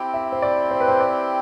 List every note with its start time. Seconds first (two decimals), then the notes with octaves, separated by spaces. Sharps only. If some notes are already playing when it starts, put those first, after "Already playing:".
Already playing: C4 E4 G4
0.14 E5
0.32 C5
0.42 D5
0.71 C5
0.80 B4
0.88 C5
1.00 D5